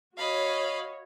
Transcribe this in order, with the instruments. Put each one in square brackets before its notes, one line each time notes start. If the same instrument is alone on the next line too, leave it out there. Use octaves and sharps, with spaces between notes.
[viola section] F#4 C#5 [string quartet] D#5 F5 B5